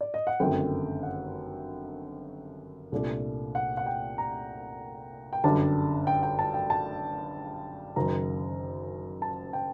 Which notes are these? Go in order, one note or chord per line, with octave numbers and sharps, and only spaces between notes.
D5
D#5
F#5
G1 F#2 D#3 A3 C4 G5
F#5
C2 A#2 A3 D4
F#5
F#5
G5
A#5
G5
G1 F#2 D3 G3 D4 A5
G5
G5
A5
G5
A5
F#1 F#2 D#3 A#5
A5
G5